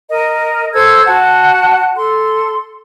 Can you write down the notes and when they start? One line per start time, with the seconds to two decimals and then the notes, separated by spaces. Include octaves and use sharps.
0.10 A#4 D#5
0.73 A4 C5 E6 G#6
1.06 F#4 F#5 A5
1.95 A4 C6